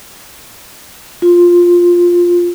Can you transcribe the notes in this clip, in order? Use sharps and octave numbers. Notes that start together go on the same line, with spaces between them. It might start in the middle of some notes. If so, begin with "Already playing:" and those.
F4